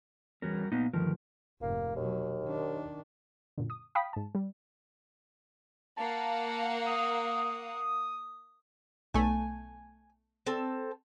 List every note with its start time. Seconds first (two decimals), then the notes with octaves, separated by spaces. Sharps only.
0.42 E2 G3 C#4 F#4 A#4
0.72 A#2 B3 D#4
0.94 D2 G2 D#3 F3 A#4
1.62 F1 G#2 A#3
1.96 D#2 B2 F#3
2.44 D#3 D4
3.58 F#2 A#2 D3
3.70 D#6
3.95 F5 G5 B5 D#6 B6
4.13 G#2 A5
4.35 G3
5.97 A#3 F5 F#5 A5
6.86 D#6
9.14 B1 A3 G#5
10.46 C4 A4